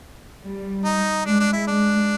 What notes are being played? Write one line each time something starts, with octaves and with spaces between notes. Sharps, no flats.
G3
D#4
G#3 D4
D4
E4
G#3 D4